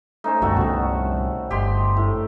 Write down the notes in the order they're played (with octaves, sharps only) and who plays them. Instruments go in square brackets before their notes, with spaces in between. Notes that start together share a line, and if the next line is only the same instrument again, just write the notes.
[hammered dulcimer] A3 C#4 C5 [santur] D#4
[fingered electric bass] C#2 F#2 D3 [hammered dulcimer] G3 [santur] A3 F#4
[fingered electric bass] C2 B3 C#4 [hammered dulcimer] D#3 G3
[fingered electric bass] G1 [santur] G4 C6 [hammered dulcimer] D#5
[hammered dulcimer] A2